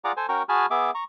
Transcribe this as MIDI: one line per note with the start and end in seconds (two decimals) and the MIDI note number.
0.05 0.12 65
0.05 0.12 68
0.05 0.12 74
0.05 0.12 78
0.05 0.12 82
0.05 0.12 86
0.17 0.26 69
0.17 0.26 72
0.17 0.26 80
0.29 0.43 61
0.29 0.43 66
0.29 0.43 70
0.29 0.43 79
0.29 0.43 82
0.29 0.43 85
0.49 0.66 66
0.49 0.66 68
0.49 0.66 80
0.49 0.66 81
0.49 0.66 83
0.49 0.66 89
0.70 0.91 59
0.70 0.91 68
0.70 0.91 76
0.70 0.91 86
0.95 1.04 82
0.95 1.04 85